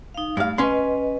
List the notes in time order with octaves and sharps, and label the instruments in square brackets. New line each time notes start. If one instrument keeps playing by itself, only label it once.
[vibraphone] D#4 F5
[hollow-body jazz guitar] G2 F5 [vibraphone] A3
[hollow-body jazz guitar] C#4 C6 [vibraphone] B4 D#5